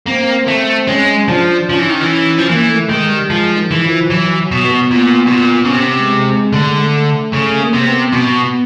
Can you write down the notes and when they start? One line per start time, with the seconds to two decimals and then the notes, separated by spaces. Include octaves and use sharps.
0.07 A#3 C4
0.34 C4
0.48 A3
0.62 C4
0.87 G#3 C#4
1.19 C#4
1.28 F3 D4
1.69 F3 C#4
1.79 E3
1.89 D#3
2.01 E3
2.38 F3
2.49 E3 A#3
2.69 A3
2.89 D#3 G#3
3.10 G3
3.29 F3 G#3
3.56 D#3
3.71 E3
3.84 F3
4.10 E3 F#3
4.37 F#3
4.51 B2
4.65 B3
4.91 A#2
5.26 B2
5.32 A#2
5.65 C#3
5.72 C3
5.99 G#3
6.26 G#3
6.52 D3 A3
6.64 G#3
6.78 A3
7.33 C#3 A3
7.60 A#3
7.73 C3
7.87 B3
8.13 B2